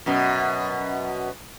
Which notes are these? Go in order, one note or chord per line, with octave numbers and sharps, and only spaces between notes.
F#2 B2